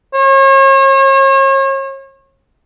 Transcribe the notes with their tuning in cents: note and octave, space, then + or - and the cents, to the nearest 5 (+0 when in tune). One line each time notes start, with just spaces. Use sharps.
C#5 -40